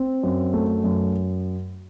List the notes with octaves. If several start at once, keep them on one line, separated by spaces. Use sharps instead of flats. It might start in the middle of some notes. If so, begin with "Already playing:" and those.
Already playing: C4
F#2
A3
F#2